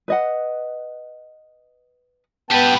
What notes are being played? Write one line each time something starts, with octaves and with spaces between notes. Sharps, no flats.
B4 D#5 F#5
B3 G4 B4 G5 A5